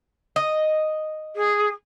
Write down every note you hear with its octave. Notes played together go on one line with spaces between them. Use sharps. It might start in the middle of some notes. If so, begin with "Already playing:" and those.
D#5
G#4